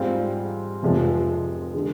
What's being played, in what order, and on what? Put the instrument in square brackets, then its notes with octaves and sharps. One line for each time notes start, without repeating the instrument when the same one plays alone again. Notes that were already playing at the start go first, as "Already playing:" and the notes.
Already playing: [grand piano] G#2 G3 C4 F4
F1 F2 C3 F3 G#3
D3 G#3